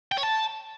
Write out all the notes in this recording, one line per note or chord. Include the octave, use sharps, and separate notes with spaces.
G5
C#5
A5